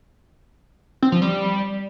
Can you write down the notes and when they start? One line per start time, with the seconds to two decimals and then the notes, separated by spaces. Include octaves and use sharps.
1.02 C4
1.12 F3
1.22 G3